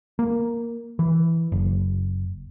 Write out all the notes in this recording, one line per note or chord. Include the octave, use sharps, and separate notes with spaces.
A#3
E3
F#1